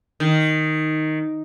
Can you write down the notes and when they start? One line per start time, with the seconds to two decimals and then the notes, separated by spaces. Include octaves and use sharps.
0.20 D#3